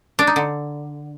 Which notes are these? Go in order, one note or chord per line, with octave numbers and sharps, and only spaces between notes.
D4
D#4
D3